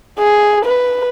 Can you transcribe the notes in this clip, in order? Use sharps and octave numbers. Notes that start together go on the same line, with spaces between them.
G#4
B4